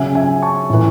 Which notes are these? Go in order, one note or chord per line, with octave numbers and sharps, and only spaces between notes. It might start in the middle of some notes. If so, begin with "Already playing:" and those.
Already playing: C#3 F#3 E5 G#5
E5 G#5
A5 C#6
A2 E3